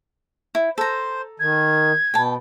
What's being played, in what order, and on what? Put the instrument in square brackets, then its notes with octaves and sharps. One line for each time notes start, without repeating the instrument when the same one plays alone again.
[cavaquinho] E4
[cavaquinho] A4 A#5 [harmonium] C5
[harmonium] D#3 [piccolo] G#6
[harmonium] B2 [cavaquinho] G5 A5